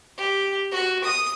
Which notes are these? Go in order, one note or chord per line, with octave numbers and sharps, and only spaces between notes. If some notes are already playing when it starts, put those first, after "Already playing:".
G4
F#4
D#6